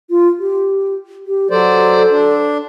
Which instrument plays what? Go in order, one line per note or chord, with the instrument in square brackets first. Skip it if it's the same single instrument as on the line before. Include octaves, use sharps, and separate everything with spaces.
[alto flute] F4
G4
G4
[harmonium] F#3 C5 D5 [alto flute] A4
[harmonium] D4